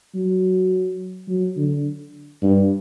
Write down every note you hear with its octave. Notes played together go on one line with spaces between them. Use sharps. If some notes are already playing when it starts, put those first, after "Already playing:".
F#3
F#3
D3
G2